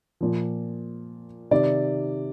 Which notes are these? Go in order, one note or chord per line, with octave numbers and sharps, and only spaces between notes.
A#2 F3
C3 D#3 D5